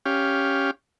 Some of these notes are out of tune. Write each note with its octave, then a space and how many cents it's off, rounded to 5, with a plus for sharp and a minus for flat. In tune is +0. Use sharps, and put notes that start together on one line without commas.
C#4 +0 G4 +0 F5 +0